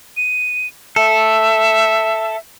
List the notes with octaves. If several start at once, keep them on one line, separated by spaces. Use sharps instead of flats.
D#7
A4 E5